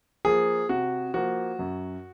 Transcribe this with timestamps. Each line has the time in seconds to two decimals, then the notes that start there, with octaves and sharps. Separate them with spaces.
0.25 F3 A#3 G#4
0.69 C3 F#4
1.14 F3 A#3 F#4
1.59 F#2